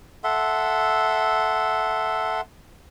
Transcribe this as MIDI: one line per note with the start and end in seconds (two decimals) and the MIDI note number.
0.24 2.41 69
0.24 2.41 76
0.24 2.41 78
0.24 2.41 84